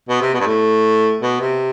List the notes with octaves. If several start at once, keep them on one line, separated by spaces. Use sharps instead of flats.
B2
C3
B2
G2
A2
B2
C3